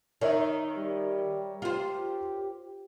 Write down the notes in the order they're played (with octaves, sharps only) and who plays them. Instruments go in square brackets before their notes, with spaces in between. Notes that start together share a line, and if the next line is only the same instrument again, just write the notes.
[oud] D#3 [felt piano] A#4 C#5 E5
[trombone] G3
[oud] F4 C5 [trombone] G4